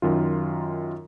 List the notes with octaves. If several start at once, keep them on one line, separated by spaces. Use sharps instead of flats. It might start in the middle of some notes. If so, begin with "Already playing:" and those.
F#2 D#3 F4